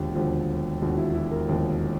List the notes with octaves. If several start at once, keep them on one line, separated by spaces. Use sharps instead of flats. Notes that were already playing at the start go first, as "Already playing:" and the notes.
Already playing: E1 D#2 D3 F3 G4
E1 D#2 D3 F3
E1 D#2 D3 F3 F#4
E4
E4
A#4
E1 D#2 D3 F3